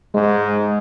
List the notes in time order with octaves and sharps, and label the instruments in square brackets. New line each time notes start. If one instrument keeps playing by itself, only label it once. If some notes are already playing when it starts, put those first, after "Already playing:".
[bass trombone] G#2 [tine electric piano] G#3